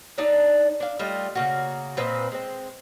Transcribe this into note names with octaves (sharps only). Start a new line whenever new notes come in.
D4 D#4 D5 E5
D4 F5
G3 A3 F4 D#5
C#3 A#3 F#4
A#2 C4 B4 D#5
G#3 C4